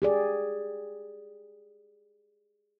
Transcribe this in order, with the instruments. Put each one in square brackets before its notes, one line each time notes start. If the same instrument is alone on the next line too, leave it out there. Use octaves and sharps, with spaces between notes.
[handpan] G4 G#4 D5